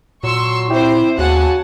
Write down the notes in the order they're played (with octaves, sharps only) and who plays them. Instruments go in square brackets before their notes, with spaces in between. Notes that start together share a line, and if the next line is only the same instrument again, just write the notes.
[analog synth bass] A#2 [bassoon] F#3 [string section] C6 C#6 E6
[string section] C4 C5 [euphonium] E4 [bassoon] G4
[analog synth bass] D#2 [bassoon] C#3 [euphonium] F#4 [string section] F#5 G#5 A5